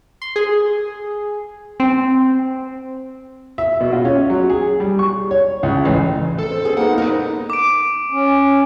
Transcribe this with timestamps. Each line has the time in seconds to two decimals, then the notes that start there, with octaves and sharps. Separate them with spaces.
0.22 C6
0.36 G#4
1.80 C4
3.58 E5
3.80 B2
3.93 F4
4.05 C#4
4.30 F#3
4.50 G#4
4.80 G3
4.99 C#6
5.31 C#5
5.63 C#2
5.85 A1
6.39 A4
6.51 C4
6.65 C4 G#4
6.77 A#3 B3 D#4 F#5
6.98 D#4 A#4 C5
7.50 D6 D7
8.12 C#4